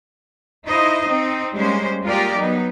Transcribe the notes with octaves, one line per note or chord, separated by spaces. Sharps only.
D#4 E4 C5 D#5 F5
C4 D#4
G3 G#3 A#3 C#4 C5
G#3 A#3 F4 G4 A#4 D5
F#3 B3 D#4